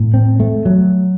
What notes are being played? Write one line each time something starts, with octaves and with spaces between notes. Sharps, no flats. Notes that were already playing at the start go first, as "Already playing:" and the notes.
Already playing: A2
C4
A3
F#3